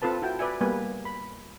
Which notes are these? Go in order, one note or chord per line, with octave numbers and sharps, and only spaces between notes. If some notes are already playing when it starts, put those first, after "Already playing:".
C4 F4 A4 B4 A5
E4 F#4 G5
B4 D5 E5 G#5
G3 A#3 B3 B4 G#5
B5